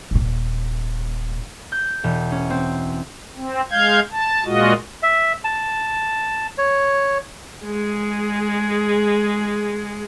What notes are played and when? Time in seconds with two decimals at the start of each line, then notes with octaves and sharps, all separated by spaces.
0.11 D#1 A#2
1.72 G6
2.04 E1
2.32 C#4
2.50 C4
3.36 C4
3.71 G#3 F5 G6 G#6
4.12 A5
4.45 A#2 G#3 F4 F#4 D#5
5.03 E5
5.44 A5
6.58 C#5
7.65 G#3 G#4